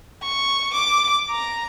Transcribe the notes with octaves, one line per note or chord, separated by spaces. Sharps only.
C#6
D6
A#5